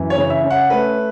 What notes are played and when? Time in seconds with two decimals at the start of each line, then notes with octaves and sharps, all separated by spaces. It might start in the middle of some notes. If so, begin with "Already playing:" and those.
Already playing: F#2 E3
0.10 C#5
0.17 C#3
0.30 E5
0.44 C#4
0.51 F#5
0.70 A3 B4